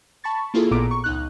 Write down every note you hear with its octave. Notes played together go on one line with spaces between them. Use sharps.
A5 B5 C#6 A6
A#3 E4 F4 G#4 A4
A1 A#2 B3 A#5 D6 D7
C#6
C#2 D#4 F#6